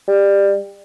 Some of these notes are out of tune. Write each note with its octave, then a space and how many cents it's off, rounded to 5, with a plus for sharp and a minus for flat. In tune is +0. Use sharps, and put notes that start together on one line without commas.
G3 +20